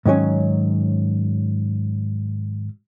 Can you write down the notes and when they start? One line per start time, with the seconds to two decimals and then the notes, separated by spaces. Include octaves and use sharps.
0.06 G#2 D#3 F#3 C#4